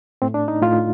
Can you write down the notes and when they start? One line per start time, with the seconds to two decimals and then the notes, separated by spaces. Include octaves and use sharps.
0.22 A2 A3 C4
0.34 D4
0.48 D#4
0.62 A2 A3 F4